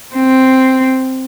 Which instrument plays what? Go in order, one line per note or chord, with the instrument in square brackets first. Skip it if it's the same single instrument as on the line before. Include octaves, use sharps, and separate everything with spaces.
[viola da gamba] C4